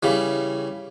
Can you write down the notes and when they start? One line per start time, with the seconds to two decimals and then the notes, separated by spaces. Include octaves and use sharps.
0.03 C#3 E3 G3